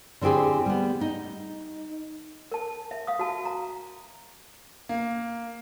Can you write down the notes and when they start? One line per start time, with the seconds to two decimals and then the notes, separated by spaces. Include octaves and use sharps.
0.21 D3 C4 E4 G4 G#4
0.66 G3 B3
1.01 D#4
2.52 A#4 A5
2.91 E5
3.07 F5 D#6
3.19 F#4 A5
3.45 A#5
4.89 A#3